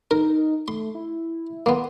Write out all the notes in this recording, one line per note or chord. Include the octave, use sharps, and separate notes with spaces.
D#4 A#4
A3 C6
E4
A#3 B3 C6